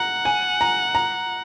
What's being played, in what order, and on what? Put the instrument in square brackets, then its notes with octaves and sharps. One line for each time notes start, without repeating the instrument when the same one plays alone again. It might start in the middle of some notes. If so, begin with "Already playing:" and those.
Already playing: [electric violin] F#5 [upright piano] A#5
[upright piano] G#5
A#5
A#5